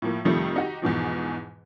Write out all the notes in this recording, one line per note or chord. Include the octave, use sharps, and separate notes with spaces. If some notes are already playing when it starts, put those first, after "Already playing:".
A2 F3 A#3
F2 C3 D#3 F3 G3 A3
D#4 F#4 G4
E2 G#2 B2 F3